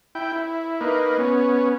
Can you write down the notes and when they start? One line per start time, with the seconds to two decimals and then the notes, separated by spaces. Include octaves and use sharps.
0.15 E4 G5
0.33 E4
0.81 A#3 D#4 B4
1.18 B3 C#4